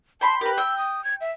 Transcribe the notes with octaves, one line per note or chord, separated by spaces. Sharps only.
G5 A5 B5 C6
G4 A#4 B4
G5 E6
D#6
G#6
E5